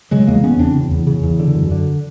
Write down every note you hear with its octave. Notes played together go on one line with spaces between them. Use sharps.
C#3 F#3 G#3
E2 G#3 A#3
C#3 B3 C#4
E2 C4 D4
C#3
E2
C#3
E2
D3
F#2
D3